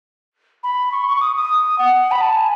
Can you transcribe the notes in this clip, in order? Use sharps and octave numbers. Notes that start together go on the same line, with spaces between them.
B5
C#6
C#6
D#6
D#6
F#5
B5
A5
G#5